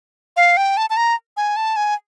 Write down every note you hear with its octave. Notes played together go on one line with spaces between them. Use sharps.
F5
G5
A5
A5
A#5
G#5
A5
G#5